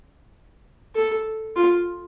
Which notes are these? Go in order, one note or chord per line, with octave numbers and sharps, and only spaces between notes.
A4
F4